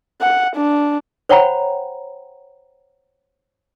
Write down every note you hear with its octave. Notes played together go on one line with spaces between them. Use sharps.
F#5
D4
C5 C#5 F#5 G5 A#5 B5